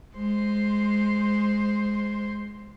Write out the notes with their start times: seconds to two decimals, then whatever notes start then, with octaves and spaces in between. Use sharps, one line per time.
0.15 G#3 C5